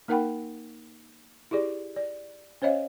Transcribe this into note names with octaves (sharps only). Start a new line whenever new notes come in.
A#3 D#4 A#4 F#5 G5 B5
E4 G4 G#4 D5
D5
C#4 C5 C#5 D#5 F5